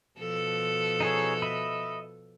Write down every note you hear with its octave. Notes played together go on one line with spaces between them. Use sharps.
B2 F3 A4
D#4 G#4 C#5
D#5 E5 B5